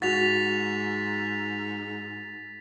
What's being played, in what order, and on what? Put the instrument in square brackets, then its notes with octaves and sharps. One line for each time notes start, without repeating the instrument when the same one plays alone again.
[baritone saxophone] G#2 [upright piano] F#4 [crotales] A6 B6 F7